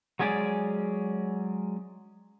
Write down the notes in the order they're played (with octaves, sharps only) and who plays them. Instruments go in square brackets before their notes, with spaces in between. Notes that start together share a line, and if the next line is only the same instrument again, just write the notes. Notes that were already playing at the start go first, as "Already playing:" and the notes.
[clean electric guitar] F#3 G#3 C#4 G#4 D5